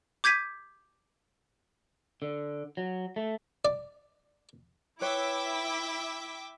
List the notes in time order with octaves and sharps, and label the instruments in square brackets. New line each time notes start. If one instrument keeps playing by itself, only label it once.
[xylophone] D6 G6 G#6 B6 D#7
[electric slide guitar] D3
F#3
A3
[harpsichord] D5
[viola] E4 [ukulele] B4 C#5 [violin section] E5 G5 D6